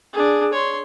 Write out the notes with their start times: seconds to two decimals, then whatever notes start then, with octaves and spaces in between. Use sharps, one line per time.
0.13 D4 G#4
0.53 C#5 C6